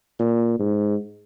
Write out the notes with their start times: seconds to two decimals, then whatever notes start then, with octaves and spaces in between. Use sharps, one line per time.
0.19 A#2
0.59 G#2